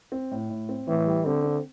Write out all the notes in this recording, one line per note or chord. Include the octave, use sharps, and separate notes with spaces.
C4
A2
A2
C4
A2 E3
G3
D3 C4
C4